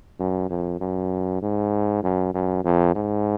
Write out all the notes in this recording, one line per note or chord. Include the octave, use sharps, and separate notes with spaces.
F#2
F2
F#2
G#2
F#2
F#2
F2
G#2